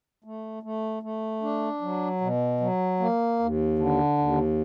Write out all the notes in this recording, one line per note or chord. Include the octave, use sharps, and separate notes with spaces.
A3
A3
A3
D4
F#3
B2
F#3
A#3
D#2
D3
D#2